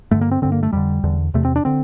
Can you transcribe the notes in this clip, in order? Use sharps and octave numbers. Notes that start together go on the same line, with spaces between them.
G2 D3 A3
A#3
C4
G2 D3 C4
A#3
A3
F2 D3 G3
E2 D3
E2 C3 A3
C4
D4
D3 C4